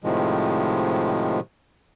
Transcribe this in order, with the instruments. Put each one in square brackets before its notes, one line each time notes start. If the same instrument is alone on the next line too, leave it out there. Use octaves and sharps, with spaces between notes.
[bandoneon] A2 C3 D#3 F3 G#3